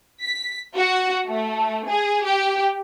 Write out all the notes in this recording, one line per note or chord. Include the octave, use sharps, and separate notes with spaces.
B6
F#4
A3
G#4
G4